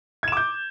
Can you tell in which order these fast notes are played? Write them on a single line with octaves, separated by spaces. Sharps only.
G#6 E7 D6 G6